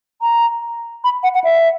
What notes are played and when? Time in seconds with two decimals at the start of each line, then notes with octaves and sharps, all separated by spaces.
0.22 A#5
1.04 B5
1.23 F#5
1.34 F#5
1.44 E5